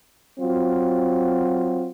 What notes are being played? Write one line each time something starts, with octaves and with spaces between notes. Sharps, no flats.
F#3 C4 F4 F#4